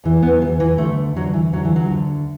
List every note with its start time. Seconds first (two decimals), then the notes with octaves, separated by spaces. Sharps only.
0.04 E2 E3
0.22 B3
0.41 E2 F#3
0.44 E3
0.60 E3
0.78 D2 D3 A3
1.16 D2 D3 F#3
1.34 E3
1.52 D2 D3 F#3
1.65 E3
1.76 F#3
1.90 D2 D3